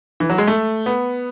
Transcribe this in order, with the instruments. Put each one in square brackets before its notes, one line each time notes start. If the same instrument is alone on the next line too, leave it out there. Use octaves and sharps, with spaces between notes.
[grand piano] E3
F#3
G#3
A3
B3